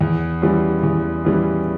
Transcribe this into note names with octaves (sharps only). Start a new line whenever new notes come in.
E2
E3 G3 C#4 F4
E2
E3 G3 C#4 F4